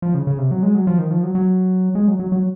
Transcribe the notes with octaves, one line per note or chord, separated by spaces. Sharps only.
F3
C#3
C#3
C3
F#3
G#3
F#3
F3
D#3
F3
F#3
F#3
G#3
F#3
F#3
F#3